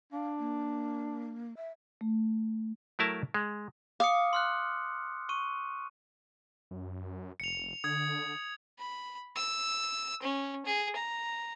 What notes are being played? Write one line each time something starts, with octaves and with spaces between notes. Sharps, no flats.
D4 F5
A#3
E5
A3
F#3 A3 E4 A#4 A5
G#3
F5 D6 D#6 C#7
C6 F6 F#6
C#6 D#7
F#2
F1 C#7 F7
D3 D#6 G#6
B5
E6
C#4
G#4
A#5